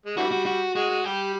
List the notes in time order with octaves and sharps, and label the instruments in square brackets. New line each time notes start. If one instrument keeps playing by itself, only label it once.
[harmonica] G#3
[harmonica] D3 E3 G3 [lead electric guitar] F#4
[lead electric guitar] F#4
F#4
[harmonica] G#3 [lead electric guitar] F#4
[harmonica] G#3
[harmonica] G3 [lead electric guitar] G4